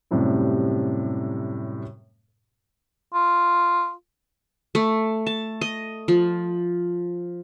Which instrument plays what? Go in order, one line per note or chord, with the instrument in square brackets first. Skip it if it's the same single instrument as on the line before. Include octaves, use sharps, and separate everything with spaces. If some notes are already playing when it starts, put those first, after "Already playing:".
[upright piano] F#2 A2 C3 G3
[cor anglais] F4
[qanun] A3
A5
D#5
F3